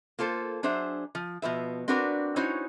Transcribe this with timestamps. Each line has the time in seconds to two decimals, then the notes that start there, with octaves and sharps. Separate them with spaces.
0.19 A#3 F4 A4 C5
0.63 F#3 D4 G#4 C5 E5
1.15 F3
1.42 B2 F3 B4 E5
1.88 C4 D4 F#4 A#4 B4 D5
2.36 C#4 D#4 E4 F#4 C5 C#5